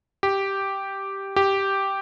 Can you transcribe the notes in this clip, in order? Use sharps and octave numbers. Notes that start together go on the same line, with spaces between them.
G4
G4